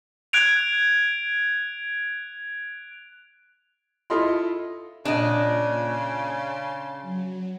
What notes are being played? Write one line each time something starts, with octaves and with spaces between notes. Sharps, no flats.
F#6 G#6 D7 F7
E4 F4 A4 D#5 B5 C6
A#2 C#3 D4 D#5
A5 C6
F#3